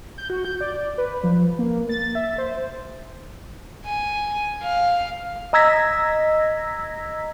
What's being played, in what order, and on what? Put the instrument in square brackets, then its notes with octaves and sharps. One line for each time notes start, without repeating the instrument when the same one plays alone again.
[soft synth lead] G6
F#4
G6
D5
B4
F3
A#3
A6
E5
C5
[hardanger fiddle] G#5
F5
[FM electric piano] D#5 A#5 E6 G#6 A#6 B6